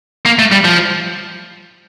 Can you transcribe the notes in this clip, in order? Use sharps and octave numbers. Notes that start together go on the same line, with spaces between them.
A#3
A3
G3
F3